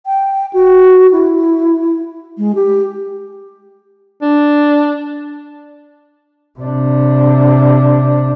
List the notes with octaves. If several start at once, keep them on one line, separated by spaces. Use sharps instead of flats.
G5
F#4
E4
G#3
G4
D4
C3 D4